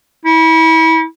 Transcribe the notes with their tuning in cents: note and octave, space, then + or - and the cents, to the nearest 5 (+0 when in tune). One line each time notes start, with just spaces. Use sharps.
E4 -30